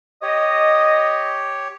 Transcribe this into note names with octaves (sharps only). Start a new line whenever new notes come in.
G4 C#5 D#5